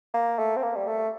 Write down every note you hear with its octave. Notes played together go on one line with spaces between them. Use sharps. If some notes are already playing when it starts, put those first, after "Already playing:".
A#3
A3
C4
A#3
G3
A3